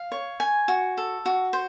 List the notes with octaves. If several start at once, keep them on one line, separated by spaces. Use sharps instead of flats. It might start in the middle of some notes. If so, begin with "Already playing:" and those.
Already playing: F5
C#5
G#5
F#4
A4
F#4
C5